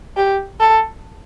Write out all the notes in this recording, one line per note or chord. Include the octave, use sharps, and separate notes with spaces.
G4
A4